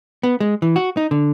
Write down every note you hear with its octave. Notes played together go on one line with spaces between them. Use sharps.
B3
G#3
E3
F#4
D#4
D3